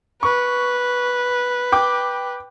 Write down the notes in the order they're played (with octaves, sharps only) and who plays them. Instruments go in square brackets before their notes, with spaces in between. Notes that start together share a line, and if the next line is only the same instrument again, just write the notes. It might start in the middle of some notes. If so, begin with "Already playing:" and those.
[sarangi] B4 [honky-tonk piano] C#6
[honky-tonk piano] G5 D6